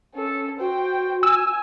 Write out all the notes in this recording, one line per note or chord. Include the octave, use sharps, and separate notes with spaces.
C#4 A4
F#4 C5 G5
G#5 E6